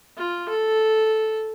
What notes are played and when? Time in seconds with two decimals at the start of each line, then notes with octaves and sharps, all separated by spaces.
0.18 F4
0.49 A4